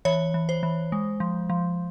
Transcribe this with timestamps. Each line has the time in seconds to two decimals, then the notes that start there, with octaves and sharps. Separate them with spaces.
0.05 E3 C#5
0.34 E3
0.49 C5
0.63 E3
0.92 G#3
1.20 F3
1.50 F3